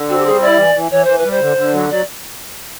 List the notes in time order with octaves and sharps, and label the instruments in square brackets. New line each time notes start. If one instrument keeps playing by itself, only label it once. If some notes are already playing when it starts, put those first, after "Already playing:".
Already playing: [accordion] D3
[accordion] C4 [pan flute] F#4
[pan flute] G4
[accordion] G3 [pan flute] G#4
[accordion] E4 [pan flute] D5
[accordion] E3
E3
[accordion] E3 [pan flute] C#5
[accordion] E3 [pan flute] C5
[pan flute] B4
[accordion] G3
[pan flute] C5
[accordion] D3
D3
F#3
[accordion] F#3 [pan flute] D5